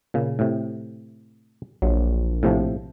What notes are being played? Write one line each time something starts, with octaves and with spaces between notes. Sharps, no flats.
A#2 C#3
A2 C3
A#1 F#3
A2 C3 F3